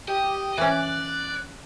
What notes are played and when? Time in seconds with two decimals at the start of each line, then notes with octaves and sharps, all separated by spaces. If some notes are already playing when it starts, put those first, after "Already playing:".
0.08 G4 D#5
0.58 E3 C#4 D5 F#6